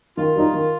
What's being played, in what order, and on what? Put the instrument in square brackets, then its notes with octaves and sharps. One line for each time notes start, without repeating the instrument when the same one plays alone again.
[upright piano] D#3 [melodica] F4
[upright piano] G3 D#4
D#3